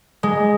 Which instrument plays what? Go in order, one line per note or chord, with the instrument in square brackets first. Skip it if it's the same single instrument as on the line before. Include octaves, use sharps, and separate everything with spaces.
[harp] G#3